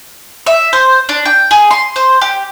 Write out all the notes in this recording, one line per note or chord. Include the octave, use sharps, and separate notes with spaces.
E5
C5
D4
G5
G#4
C6
C5
G4